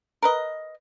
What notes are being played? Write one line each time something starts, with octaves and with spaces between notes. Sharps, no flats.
A#4 B4 D#5